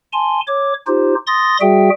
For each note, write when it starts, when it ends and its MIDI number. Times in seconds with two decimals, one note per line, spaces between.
0.13 0.40 80
0.13 0.40 81
0.13 0.40 84
0.47 0.73 73
0.47 0.73 86
0.87 1.15 63
0.87 1.15 65
0.87 1.15 67
0.87 1.15 72
1.27 1.57 84
1.27 1.57 87
1.27 1.57 93
1.27 1.57 94
1.61 1.90 55
1.61 1.90 66
1.61 1.90 68
1.61 1.90 76
1.61 1.90 79